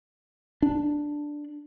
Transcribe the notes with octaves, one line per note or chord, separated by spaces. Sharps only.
D4